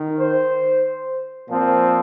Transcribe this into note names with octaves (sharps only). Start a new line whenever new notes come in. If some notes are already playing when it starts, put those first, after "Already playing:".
Already playing: D#3
C5
A#2 F3 C4